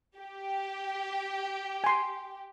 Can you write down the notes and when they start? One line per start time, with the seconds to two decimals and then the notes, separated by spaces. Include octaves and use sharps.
0.18 G4
1.84 G#5 C6